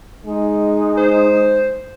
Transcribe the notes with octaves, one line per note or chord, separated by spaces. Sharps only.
G#3 D#4
C5